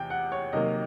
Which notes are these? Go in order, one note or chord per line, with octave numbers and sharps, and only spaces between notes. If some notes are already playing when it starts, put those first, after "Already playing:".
Already playing: E2 C3 G5
F#5
C#5
C3 D#3 F#3 A#3 D#5